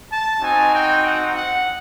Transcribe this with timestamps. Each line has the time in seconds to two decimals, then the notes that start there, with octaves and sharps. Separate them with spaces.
0.10 A5
0.41 C4 D#4 F#4 G#5
0.72 G5
1.04 F#5
1.35 F#5